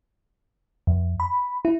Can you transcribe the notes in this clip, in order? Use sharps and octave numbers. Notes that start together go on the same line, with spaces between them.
F2
B5
E4